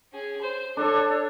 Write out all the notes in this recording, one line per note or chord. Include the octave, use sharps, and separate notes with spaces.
C#4 G#4
C5
D4 A4 C#5 D5